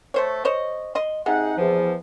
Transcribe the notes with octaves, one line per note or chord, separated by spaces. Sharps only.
A3 C5 C#5
C5 C#5 D#5
D#5 C6
C3 D#4 G#4 F#5
E2 F3